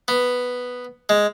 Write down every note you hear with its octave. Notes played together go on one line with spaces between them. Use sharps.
B3
G#3